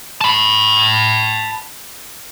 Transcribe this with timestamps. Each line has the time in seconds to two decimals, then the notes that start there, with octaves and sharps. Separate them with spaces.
0.21 A5 B5